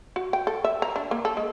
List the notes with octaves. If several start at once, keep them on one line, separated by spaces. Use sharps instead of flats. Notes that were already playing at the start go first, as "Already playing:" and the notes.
F#4
G5
A4
E5
A#5
D4
A#3
A4
G#3